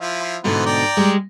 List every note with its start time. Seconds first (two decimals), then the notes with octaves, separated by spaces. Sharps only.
0.01 F3 E4 F4
0.44 G#2 B2 D3 E3 B3 C5
0.66 D5 G5 A#5
0.97 G3 G#3